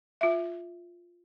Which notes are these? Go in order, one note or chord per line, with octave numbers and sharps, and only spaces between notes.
F4 E5